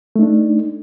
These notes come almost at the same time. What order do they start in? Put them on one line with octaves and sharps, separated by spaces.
A3 D#4 D4